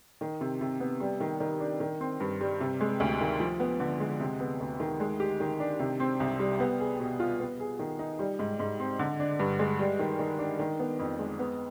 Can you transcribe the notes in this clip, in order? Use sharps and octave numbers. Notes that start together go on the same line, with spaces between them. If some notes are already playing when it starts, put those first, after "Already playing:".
D#3
C3
C3
B3
G3
D#3
D#3
D4
D#3
C4
G2
G3
C3
G#3
D2
D#3
F3
B3
D3
G#3
C3
B3
D2
D#3
G#3
G4
D#3
D4
C3
C4
C2
G3
B3
G#4
B2
F4
B3
G#4
D#3
D#4
G3
G#2
G#2
C4
D3
D4
G2
G#3
G3
D#3
D#3
D4
D#3
B3
F2
G#3
B3